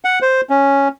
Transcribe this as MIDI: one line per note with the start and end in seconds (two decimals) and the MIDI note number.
0.05 0.19 78
0.22 0.41 72
0.50 0.88 61